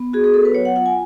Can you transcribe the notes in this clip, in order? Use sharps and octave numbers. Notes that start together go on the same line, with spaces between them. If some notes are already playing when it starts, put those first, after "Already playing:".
Already playing: B3
F#4 G#4
G#4
B3 A4
B4
F#3 C#5
F#5
F4 F#5
G#5